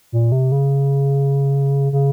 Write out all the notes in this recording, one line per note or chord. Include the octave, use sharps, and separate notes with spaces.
A#2
C3
C#3
C#3